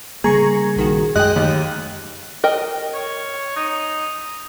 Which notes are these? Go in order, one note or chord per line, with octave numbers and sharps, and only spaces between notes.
C#3 G3 A#3 G#4 A#5 C#6
A#1 D#3 F#4
F#2 G#3 D#5 G5 F#6
D#2
A#4 D#5 G5
C#5
D#4